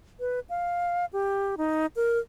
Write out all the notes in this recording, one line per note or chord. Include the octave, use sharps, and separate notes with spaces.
B4
F5
G4
D#4
A#4